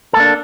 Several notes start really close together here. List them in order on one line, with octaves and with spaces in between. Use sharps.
A4 A#3 D4